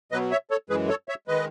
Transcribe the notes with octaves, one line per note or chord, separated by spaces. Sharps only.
B2 F#3 B4 D#5
C#5 E5
A4 C#5
F#2 E3 G#3 G#4 B4
A4 C#5
C#5 E5
D#3 G#3 B4 D#5